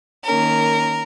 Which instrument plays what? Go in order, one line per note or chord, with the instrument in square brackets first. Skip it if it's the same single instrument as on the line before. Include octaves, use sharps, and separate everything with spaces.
[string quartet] D#3 A#3 C#4 A#4